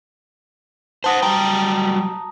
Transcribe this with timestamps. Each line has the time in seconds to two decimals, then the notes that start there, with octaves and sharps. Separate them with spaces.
1.04 C5 F#5 A5 D#6 A#6
1.22 F#3 G3 G5 A#5